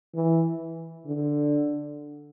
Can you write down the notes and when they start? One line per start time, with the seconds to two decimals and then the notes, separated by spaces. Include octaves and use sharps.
0.15 E3
1.06 D3